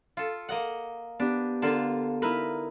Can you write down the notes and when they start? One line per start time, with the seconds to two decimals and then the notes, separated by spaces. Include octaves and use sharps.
0.17 F4 A4
0.49 A#3 D#5 F#5
1.20 B3 D4 G4
1.62 D3 A#3 F4 A5
2.22 D#4 E4 A#4 B4